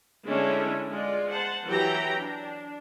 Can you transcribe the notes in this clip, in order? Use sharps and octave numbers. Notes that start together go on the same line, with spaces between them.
D3 G#3 A3 C#4 D4 E4
G#3 F4 D5
C5 F#5 A5
E3 F#3 E4 G4 G5 A#5
D4